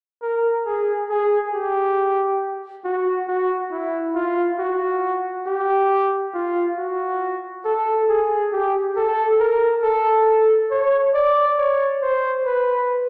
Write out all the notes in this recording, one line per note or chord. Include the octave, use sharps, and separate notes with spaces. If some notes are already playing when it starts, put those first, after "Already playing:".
A#4
G#4
G#4
G4
F#4
F#4
E4
F4
F#4
G4
F4
F#4
A4
G#4
G4
A4
A#4
A4
C#5
D5
C#5
C5
B4